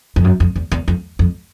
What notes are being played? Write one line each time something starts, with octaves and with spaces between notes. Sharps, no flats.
F2
F#2
F2
E2
E2
F2
F2